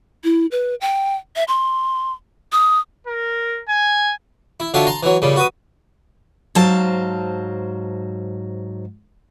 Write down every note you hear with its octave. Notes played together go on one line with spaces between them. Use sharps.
E4
B4
G5
E5
C6
D#6
A#4
G#5
E4
D3 F#3 F4 E5 A5
A5 A#5 C6
E3 F#3
A#2 C#3 G3
F#4 B4 D#6
G#2 F#3 C5 F5 A5